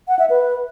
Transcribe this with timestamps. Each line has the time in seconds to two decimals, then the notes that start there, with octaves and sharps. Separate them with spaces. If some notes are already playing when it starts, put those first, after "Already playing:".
0.08 F#5
0.19 E5
0.30 B4